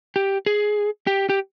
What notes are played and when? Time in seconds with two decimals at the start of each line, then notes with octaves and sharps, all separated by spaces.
0.16 G4
0.46 G#4
1.07 G4
1.30 G4